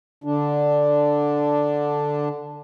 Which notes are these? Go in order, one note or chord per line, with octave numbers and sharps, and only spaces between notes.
D3 D4